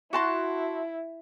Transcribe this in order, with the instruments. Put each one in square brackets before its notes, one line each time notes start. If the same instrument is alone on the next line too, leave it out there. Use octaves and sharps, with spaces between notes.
[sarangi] E4 [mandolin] F#4 A5 C6